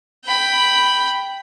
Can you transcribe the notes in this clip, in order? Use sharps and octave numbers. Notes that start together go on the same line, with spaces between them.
G5 B5